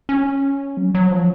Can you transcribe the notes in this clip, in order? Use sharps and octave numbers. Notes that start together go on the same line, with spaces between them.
C#4
F#3
F#3
F3